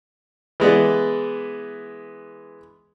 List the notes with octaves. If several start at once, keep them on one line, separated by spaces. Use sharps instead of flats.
E3 G#3 B3 D5